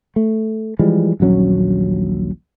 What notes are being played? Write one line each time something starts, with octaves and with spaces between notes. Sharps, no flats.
A3
E3 F3 G3 G#3
D#1 A#1 F#3 C#4